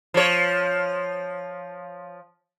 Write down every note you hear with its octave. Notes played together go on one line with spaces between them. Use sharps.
F3 C#5